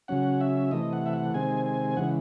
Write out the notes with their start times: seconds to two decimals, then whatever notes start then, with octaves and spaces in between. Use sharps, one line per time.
0.08 C#3 F#3 C#4 F#5
0.41 E5
0.71 C3 E3 A3 D#5
0.93 F#5
1.06 E5
1.13 F#5
1.34 C3 D#3 G#3 C4 G#5
1.66 G#5
1.97 C#3 E3 G#3 F#5